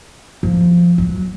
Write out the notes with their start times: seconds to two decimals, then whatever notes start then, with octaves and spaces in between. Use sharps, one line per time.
0.43 F3
0.98 F#3